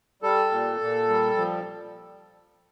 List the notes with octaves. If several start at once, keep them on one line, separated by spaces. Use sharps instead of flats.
G3 A4
A#2
A#2
G3
F3